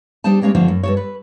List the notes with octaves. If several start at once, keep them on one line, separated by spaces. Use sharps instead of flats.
G3 D4 G#4 C5 A5
G3 G#3 A#3 C#4 C#5 D5
F2 D3 F3 A3
F#2
G2 A4 C#5
B4